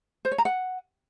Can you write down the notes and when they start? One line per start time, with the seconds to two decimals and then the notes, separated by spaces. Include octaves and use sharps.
0.25 C5
0.32 C#5
0.38 A#5
0.45 F#5